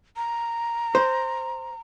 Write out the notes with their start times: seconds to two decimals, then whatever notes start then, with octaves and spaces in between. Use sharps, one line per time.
0.16 A#5
0.95 C5